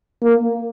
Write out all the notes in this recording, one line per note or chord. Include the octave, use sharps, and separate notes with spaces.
A#3